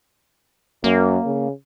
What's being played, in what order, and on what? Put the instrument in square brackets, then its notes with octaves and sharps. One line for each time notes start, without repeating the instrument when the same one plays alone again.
[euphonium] F#2 [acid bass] A#3
[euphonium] C#3